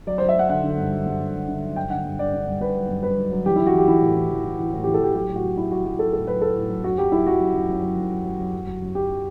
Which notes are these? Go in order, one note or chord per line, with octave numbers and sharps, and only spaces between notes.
F#3 D5
F#3 C5
E5
F#3 F#5
D3 F#5
D3
G2
F#3
G2
G2
G2
D3
F#3
G2 G5
D3 F#5
G2
D3 D5
D3
G2
G2 B4
F#3
G2
G2 B4
F#3
F#3
E3 G4
E3 E4
F#4
E3 G4
E3 E4
A2
E3
E3
E3
E3
A2
E3 G4
A4
E3 G4
F#3 G4
A2
F#4
F#3
F#3 E4
F#3 F#4
F#3 F#4
F#3 A4
A2 A4
F#3 B4
F#3 A4
A2
F#3
F#2 F#4
F#3 G4
F#3 E4
F#2 F#4
F#2
F#2
F#2
F#3
F#2
F#3
F#3
F#2
F#2
F#3
F#2
F#3 G4